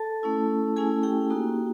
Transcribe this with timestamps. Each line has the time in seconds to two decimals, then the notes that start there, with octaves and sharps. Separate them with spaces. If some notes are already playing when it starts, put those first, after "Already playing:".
Already playing: A4 A5
0.23 A3 C#4 E4
0.76 A3 C#4 E4 G#4 G#5
1.03 G4 G5
1.30 A#3 D#4 F#4